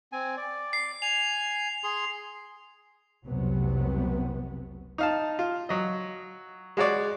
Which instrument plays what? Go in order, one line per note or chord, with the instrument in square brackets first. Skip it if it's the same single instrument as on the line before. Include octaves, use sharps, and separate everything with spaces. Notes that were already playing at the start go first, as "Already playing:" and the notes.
[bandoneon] C4 G#5
D5
[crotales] C7
[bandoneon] G#5 [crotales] F7
[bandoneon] G#4 C6
[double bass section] F1 C2 C3 F#3 B3
[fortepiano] D#4 F5 A5
F4
F#3 D#5
G#3 F#4 C#5 D5